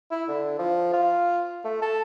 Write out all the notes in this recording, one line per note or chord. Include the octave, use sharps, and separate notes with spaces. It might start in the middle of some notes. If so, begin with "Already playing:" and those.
E4
D3
F3
F4
A3
A4